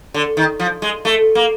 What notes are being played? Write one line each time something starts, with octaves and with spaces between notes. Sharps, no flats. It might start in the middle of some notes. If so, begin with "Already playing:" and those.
D3
D#3
F3
G#3
A3
A#3